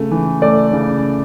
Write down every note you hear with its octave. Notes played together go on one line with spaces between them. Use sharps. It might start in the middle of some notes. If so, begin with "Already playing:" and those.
Already playing: C#3 A3
E3
A3 D5
C#3